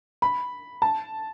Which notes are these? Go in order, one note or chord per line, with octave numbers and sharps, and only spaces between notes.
B5
A5